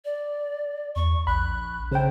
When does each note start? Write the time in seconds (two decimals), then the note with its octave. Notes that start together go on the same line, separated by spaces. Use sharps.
0.05 D5
0.96 E2 C#6
1.27 A#1 B5 F#6
1.92 C#3 C5 G5